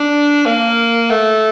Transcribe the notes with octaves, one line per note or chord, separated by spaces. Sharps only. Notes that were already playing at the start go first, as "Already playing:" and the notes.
Already playing: D4
A#3
A3